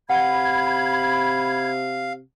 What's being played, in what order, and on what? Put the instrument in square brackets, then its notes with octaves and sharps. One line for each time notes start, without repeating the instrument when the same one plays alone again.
[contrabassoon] C3 [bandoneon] F5 [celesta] F#5 [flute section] B5 G#6